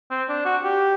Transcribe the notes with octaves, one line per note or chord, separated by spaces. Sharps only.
C4
D4
F#4
G4